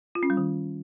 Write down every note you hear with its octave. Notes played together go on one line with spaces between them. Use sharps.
F4
C#4
G3
D#3